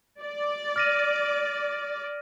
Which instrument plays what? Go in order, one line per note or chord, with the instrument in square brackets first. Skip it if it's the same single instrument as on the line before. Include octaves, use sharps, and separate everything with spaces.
[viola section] D5
[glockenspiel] F6 A#6 D#7